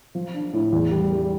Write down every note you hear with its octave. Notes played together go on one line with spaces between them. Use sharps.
F3
D4
A2
E2
G3
G3